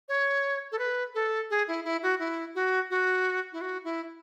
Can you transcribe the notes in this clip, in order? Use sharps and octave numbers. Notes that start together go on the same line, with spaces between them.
C#5
A4
B4
A4
G#4
E4
E4
F#4
E4
F#4
F#4
E4
F#4
E4